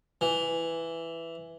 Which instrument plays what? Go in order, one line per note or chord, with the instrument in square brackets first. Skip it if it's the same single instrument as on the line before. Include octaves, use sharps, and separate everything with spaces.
[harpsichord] E3